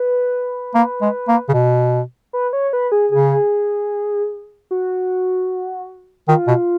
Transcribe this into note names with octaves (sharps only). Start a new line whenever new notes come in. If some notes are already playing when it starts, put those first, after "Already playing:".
Already playing: B4
A#3
G#3
A#3
C#3
B2
B4
C#5
B4
G#4
C#3 G#4
F#4
D#3 F4
B2